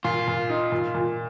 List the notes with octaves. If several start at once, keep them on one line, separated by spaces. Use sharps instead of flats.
A#2 F4
A#2
D#4
A#2
A#2